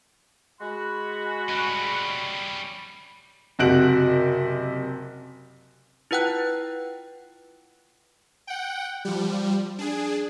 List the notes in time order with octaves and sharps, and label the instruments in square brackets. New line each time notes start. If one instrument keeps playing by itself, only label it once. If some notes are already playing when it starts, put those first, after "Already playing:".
[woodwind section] G#3 F#4 [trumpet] B5
[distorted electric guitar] G3 C#4
[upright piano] F#1 C3 F#4 F#6 D7 F#7
[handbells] E4 F4 B4 F#5 G5 F#6
[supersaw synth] F#5 G5
F3 G3
D4 G#4